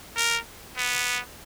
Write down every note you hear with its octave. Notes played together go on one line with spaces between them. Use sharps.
A#4
B3